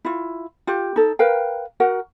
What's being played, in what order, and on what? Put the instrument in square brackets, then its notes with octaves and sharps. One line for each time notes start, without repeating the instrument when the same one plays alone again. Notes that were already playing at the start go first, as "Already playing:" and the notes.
[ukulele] E4 F4
F4 G4
D#4 A4
A#4 B4 F5 G5
F#4 A#4 F#5